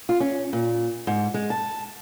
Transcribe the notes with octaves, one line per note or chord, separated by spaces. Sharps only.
F4
C#4
A#2
G#2
G#3
A5